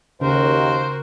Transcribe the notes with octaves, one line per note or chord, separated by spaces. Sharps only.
D#2 C#3 F#4 A#4 C5